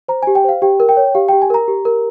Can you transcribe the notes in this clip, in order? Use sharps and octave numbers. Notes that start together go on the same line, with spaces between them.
C5 A#5
G4 G#5
G5
C5 F5
G4 G5
A#4
G5
C#5
G4 F5
G4 G5
G#5
A#4 A#5
G4
A#4